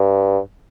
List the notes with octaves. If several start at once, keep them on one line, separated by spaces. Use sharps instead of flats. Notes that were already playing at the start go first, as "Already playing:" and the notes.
Already playing: G2